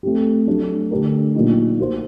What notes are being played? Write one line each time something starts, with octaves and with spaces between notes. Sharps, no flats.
A3 C4 G4
F#3 A3 D4 G4
D3 A3 D4 G4 A#4
A#2 F#3 A#3 D#4 G4
A#3 F#4 C5